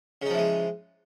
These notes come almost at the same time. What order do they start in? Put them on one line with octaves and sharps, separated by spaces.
C#3 D#4 F3 E3 G#3